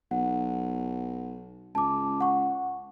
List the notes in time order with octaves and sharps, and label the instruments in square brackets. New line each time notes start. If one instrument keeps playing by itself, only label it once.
[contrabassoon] B1 [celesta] F#5
[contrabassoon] C#2 [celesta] A5 D6
[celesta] F#5 C#6